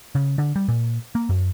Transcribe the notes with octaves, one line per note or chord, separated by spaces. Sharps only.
C#3
D3
G3
A#2
A#3
F#2